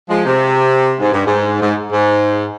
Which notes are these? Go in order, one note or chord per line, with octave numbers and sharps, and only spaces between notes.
F3 G#3
C3
G#2
G2
G#2
G#2
G#2